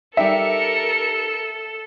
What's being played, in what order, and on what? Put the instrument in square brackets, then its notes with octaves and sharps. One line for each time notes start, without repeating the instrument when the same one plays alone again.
[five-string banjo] G3 D#4 G5 [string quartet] A4 [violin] A#4 C#7 [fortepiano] E5